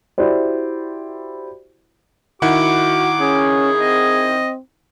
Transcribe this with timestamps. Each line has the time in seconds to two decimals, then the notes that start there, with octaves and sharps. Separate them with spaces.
0.18 E4 F#4 G4 C5 D5
2.42 D#3 E4 F#4 F#5 D6
3.20 C#4 G#4
3.79 C4 D#5